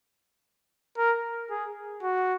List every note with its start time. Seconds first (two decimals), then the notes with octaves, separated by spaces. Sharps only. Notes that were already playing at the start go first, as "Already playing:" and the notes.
0.98 A#4
1.50 G#4
2.03 F#4